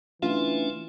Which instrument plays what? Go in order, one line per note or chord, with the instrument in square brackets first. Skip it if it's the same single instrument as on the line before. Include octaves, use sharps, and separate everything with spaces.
[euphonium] E3 [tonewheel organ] A3 C#4 D4 [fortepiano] F4